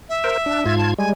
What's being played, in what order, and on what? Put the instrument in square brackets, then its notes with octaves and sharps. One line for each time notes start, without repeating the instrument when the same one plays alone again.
[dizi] E5
[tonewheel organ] A#4 C5
D4
G#2 F4 G#6
[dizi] A5
[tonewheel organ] G3 G#3 [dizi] G#5